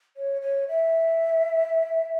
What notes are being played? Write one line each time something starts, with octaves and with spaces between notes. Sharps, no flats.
C#5
C#5
E5